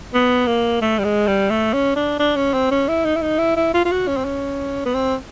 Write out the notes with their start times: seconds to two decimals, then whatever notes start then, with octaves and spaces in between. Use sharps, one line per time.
0.13 B3
0.47 A#3
0.81 A3
0.99 G3
1.04 G#3
1.27 G3
1.50 A3
1.73 C#4
1.96 D4
2.19 D4
2.36 C#4
2.53 C4
2.71 C#4
2.88 E4
3.05 D#4
3.16 E4
3.22 D#4
3.39 E4
3.56 E4
3.74 F4
3.85 F4
3.92 F#4
4.08 C#4
4.17 C4
4.25 C#4
4.86 B3
4.94 C4